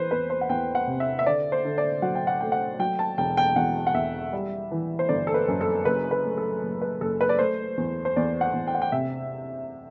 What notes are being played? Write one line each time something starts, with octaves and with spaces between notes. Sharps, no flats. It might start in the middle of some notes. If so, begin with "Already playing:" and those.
Already playing: E3 B4 C5
E2 B4
C5
F#5
E2 G5
F#5
C3
E5
E5
D3 D5
C5
D3
D5
F#3 F#5
G5
F#5
A3 G5
F#5
F#3 G5
A5
E1 G5
G5
E2 F#5
F#5
E2 E5
G3
E3
C5
G1 D5
A4
B4
F#2
A4
F#1 B4
B4
A3
A4
F#1
B4
F#1 A4
B4
D5
A3 C5
E2
C5
E2 D5
F#5
E2
G5
F#5
G5
C3 E5